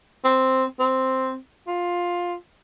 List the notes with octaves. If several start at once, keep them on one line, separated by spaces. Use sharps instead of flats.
C4
C4
F4